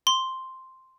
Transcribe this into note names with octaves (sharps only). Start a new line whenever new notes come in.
C6